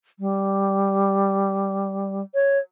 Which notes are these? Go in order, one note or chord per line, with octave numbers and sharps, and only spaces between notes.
G3
C#5